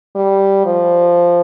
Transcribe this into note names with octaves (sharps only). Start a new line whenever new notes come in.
G3
F3